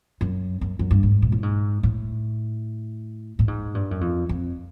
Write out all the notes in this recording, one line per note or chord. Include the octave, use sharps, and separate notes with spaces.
F#2
F#2
F#2
G2
G#2
A#2
A2
G#2
A2
A2
G#2
G2
F#2
F2
F2